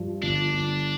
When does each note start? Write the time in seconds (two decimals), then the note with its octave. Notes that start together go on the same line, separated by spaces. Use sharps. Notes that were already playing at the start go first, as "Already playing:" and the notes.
Already playing: G2 F3
0.22 G1 D4
0.53 G1